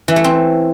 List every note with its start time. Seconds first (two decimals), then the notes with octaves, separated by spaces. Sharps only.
0.08 E3
0.16 A3
0.24 C4